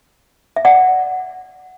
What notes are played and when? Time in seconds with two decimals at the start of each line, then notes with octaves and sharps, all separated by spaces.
0.56 E5
0.65 D5 F#5